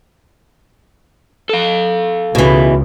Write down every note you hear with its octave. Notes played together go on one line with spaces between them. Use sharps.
A4 F5
C#2 B2 E3